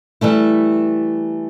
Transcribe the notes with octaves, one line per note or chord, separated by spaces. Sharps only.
E3 G3 A3 E4